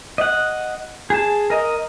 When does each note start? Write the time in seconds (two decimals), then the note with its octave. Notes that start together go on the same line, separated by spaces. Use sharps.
0.18 D#5 F#5
1.10 G#4 A5
1.50 A#4 D#5